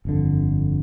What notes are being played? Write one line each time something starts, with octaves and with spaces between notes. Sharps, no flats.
G1 F2 D3